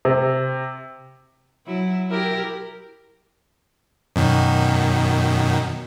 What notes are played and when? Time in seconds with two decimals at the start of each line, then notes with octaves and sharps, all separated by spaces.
0.05 C3
1.66 F#3 E4
2.10 E4 G4 A#4
4.16 F#2 B2 D#3